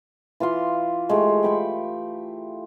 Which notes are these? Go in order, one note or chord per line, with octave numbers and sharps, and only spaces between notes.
E3 F4 F5 C6
G#3 A3 G4
G5 B5 C#6